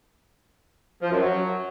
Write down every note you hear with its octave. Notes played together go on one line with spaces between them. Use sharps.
F3
F#2
F#3